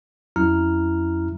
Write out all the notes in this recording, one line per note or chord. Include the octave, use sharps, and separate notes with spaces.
F2 F#3 C#4 E4 A#5 F6